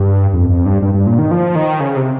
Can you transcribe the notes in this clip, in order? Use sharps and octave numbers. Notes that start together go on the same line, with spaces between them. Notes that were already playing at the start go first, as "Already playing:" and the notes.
Already playing: G2
F2
F2
G2
G2
G2
A#2
D#3
F3
D#3
C#3
C3